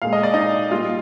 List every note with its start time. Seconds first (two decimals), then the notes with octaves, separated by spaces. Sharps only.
0.02 A#2 G#3 F5
0.13 D#5
0.23 D5
0.34 D#4 D#5
0.71 A#2 G3 F4 F5